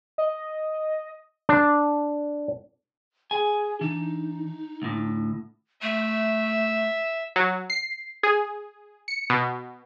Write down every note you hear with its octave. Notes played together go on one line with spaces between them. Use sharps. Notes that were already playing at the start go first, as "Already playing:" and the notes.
D#5
D4
G#4 G#5
E3 D4 D#4
D2 A2
A3 E5
F#3
C7
G#4
C#7
B2